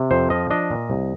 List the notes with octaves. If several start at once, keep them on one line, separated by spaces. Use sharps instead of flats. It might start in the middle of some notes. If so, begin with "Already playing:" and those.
Already playing: C3
F2 C5
F3 D#5
D4 D#5
A#2
C2